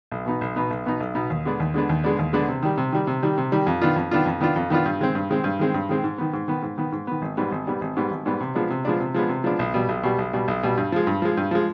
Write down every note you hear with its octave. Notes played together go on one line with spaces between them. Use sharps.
B1
B2 B3 D#4
B1
B2 B3 D#4
B1
B2 B3 D#4
B1
B2 B3 D#4
D#2
D3 G#3 B3 D4
D#2
D3 G#3 B3 D4
D#2
D3 G#3 B3 D4
D#2
D3 G#3 B3 D4
C3
D#3 G3
C3
D#3 G3
C3
D#3 G3
C3
D#3 G3
F2
D#3 B3 D4 F4
F2
D#3 B3 D4 F4
F2
D#3 B3 D4 F4
F2
D#3 B3 D4 F4
G2
D#3 G#3 C4
G2
D#3 G#3 C4
G2
D#3 G#3 C4
G2
D#3 G#3 C4
G#2
D#3 B3
G#2
D#3 B3
G#2
D#3 B3
G#2
D#3 B3
G#1
G#2 G3 B3
G#1
G#2 G3 B3
G#1
G#2 G3 B3
G#1
G#2 G3 B3
C3
F3 G#3 B3 D4
C3
F3 G#3 B3 D4
C3
F3 G#3 B3 D4
C3
F3 G#3 B3 D4
B1
B2 G3
B1
B2 G3
B1
B2 G3
B1
B2 G3
G2
F3 G#3
G2
F3 G#3
G2
F3 G#3